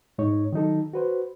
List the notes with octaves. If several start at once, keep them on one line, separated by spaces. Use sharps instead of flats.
G#2 G#3 D#4 C#5
D#3 F#3 D#4 A4
F#4 B4 C5